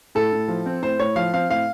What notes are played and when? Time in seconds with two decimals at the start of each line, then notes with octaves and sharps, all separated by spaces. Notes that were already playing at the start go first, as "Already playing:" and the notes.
0.15 A2 A4
0.33 A2
0.48 F3
0.66 C4
0.82 A2 C5
0.99 A2 C#5
1.16 F3 F5
1.34 C4 F5
1.50 A2 F5